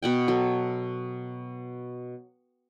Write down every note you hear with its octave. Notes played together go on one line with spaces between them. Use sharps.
B2 F#5 G5
F#3 A4